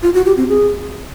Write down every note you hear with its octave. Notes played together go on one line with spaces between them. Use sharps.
F4
F#4
G4
C4
G#4